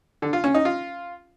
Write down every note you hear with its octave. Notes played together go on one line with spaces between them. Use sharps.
D3
F4
C#4
D#4
F4